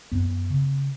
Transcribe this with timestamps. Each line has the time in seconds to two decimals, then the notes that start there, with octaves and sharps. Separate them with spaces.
0.11 F#2 B3
0.50 C#3